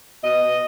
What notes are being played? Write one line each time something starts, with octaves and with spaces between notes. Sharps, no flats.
B2 D#5
B2